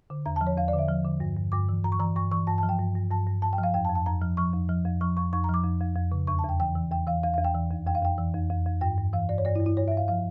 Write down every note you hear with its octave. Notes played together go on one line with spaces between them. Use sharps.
D3
E2 A#5
A5
F3
C#5
E2 F5
D5
D3
E5
F3
D3
G2
G2
G2 D6
E3
G2 A#5
C#6
E3 A#5
G2 C#6
E3 C#6
G2 A5
A5
F3
G5
G2
G2
G2 A5
G2
G2 A5
G5
F3
F5
F2 G5
A5
F2
A5
F2 A#5
F3
F3 C#6
F2
F3
F2
F3 C#6
F2 C#6
F2 C#6
A#5
F3
D6
F2
F2
F2
C#3
E2 C#6
A5
E2
G5
E3 G5
E3
E2 G5
E3 F5
E2 F5
F5
E2
G5
E3
F2
F2 G5
F5
F2 G5
E3
F2
F2
F2
G2 G5
G2
E3 F5
G2 D5
C#5
G2 D5
E4
G2
E4
G2 C#5
E5
G2
F5
F3 F5